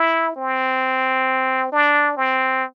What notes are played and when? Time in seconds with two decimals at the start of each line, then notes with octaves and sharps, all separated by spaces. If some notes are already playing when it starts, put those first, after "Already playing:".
Already playing: E4
0.36 C4
1.72 D4
2.17 C4